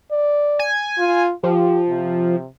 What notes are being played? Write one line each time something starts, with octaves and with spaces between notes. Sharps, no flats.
D5
G#5
F4
F3 G4
C3